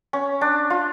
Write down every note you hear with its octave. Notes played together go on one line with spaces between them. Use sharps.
C#4
D4
F4